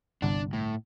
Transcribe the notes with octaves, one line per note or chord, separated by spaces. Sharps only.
G1 C2 D4 F#5
A2